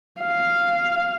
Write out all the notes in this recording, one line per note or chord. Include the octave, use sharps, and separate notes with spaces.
F5